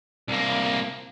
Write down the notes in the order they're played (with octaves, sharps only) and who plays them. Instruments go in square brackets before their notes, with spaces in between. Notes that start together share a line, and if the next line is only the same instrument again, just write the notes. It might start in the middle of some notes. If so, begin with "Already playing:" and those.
[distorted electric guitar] C2 A#3